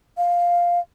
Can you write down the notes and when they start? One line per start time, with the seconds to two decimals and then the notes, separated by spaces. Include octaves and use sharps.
0.17 F5